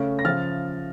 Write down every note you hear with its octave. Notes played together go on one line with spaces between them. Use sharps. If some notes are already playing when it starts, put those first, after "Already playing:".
Already playing: C#3 A3 C#4
A#6
C#3 F3 F6 A6